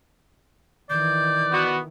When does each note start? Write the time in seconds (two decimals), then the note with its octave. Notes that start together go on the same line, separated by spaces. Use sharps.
0.90 D#3 E3 D5 G6
1.52 B3 F#4